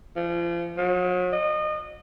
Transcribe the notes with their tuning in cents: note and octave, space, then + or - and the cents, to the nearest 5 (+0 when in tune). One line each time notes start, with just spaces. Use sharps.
F3 -35
F#3 -40
D#5 -30